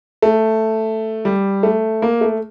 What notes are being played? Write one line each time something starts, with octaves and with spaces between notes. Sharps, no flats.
A3
G3
A3
A#3
A3